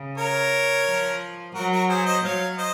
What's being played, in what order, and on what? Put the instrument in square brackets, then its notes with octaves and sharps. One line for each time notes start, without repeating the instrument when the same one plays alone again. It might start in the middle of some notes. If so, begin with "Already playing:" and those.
Already playing: [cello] C#3
[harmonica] A#4 C#5
[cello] F3
[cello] F#3 [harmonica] F#4 A#4
[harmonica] F#4 A#4
G#4 C5
C5 D#5
[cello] F#3 [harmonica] C#5 F5
[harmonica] C5 D#5